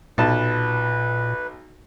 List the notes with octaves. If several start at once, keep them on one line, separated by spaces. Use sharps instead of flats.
B1 A#2 B4 A5